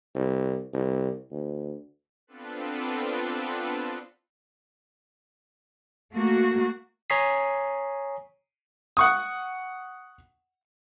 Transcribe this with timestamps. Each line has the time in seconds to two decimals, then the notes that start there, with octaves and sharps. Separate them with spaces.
0.15 C2
0.73 C2
1.31 D2
2.27 B3 C4 D4 F4 A4 B4
6.13 A3 A#3 F#4
7.10 C#5 G#5 A#5 D#6 B6 C7
8.97 F#5 C#6 D#6